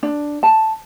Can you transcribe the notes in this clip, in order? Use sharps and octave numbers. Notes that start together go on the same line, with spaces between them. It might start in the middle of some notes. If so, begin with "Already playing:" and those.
D4
A5